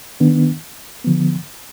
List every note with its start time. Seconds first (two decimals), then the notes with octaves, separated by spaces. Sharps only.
0.20 D#3 B3 D4
1.04 D3 F3 B3